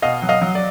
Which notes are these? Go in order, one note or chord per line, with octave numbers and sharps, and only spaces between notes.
B2 D#5 F5
F#3
D#5 F5
F#3
D5